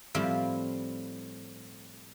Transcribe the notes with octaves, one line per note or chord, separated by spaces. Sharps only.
A2 F3 G3 C4 E4 C5